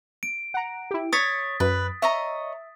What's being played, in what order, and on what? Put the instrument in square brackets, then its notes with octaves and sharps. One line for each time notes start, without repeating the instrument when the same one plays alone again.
[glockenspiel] D7
[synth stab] F#5 A#5
E4 G4
[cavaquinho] C#5 [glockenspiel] D#6 A6 B6 [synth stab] C#7
[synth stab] F#2 [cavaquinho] B4
[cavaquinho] C#5 D#5 A#5 [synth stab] E5